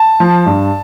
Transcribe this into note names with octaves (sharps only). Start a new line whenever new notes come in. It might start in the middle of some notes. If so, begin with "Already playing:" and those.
Already playing: A5
F3
G2